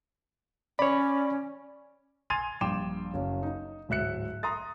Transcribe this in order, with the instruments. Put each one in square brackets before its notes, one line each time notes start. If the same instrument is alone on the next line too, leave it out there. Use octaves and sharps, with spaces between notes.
[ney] C#4 [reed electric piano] C#5 B5 [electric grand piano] D5
[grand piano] G#5 C6 G#6 A6 D#7 F7
A#1 G2 G5 C6 D6 E7
F#1 C#4
D#4
D1 G#2 E5 F#6 C#7
A#5 C6 D#6 A6